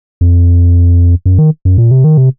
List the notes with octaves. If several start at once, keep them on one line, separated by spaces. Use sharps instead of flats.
F2
F#2
D#3
F#2
A#2
C3
D#3
C3